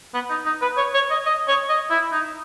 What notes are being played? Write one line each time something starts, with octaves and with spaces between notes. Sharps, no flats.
B3
D#4
D#4
B4
C#5
C#5
D#5
D#5
C#5
D#5
E4
D#4